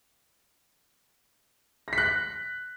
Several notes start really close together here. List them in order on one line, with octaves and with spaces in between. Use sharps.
A#6 B6 F#6